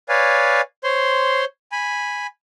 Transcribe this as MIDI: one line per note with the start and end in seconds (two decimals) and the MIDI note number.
0.09 0.61 71
0.09 0.61 73
0.09 0.61 74
0.09 0.61 77
0.09 0.61 80
0.84 1.45 72
0.84 1.45 73
0.84 1.45 84
1.72 2.27 80
1.72 2.27 83